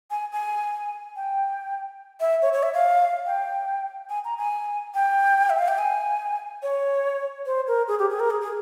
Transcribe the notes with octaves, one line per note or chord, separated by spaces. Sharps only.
G#5
G#5
G5
E5
C#5
C#5
E5
F5
G5
G#5
A#5
G#5
G5
E5
F5
G5
G#5
C#5
C5
A#4
G#4
G4
G#4
A#4
G#4
G#4